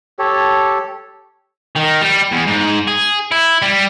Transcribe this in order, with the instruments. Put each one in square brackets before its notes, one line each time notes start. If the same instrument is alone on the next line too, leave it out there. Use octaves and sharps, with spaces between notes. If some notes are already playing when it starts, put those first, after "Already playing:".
[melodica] G4 A4 C#5
[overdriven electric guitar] D#3
G3
E2
G#2
G#4
E4
G3